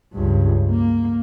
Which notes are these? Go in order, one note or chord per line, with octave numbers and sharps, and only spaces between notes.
C#2 G2
A#3